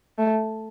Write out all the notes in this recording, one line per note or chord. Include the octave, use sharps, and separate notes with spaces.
A3